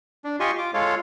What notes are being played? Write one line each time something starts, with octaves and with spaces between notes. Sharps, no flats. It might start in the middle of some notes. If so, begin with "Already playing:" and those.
D4
F4 G4 D#5 G#5 C6 C#6
F4 D6
G#3 F4 A4 C#5 F5